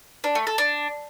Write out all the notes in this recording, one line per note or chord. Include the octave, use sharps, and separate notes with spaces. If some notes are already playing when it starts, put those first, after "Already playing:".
D4
A3
A4
D4